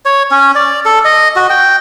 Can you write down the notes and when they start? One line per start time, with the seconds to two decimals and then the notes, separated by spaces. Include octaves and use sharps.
0.05 C#5
0.31 C#4
0.55 D5
0.85 A4
1.05 D#5
1.36 F#4
1.50 G5